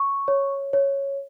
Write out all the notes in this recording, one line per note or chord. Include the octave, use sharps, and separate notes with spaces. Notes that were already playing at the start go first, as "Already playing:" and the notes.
Already playing: C#6
C#5
C#5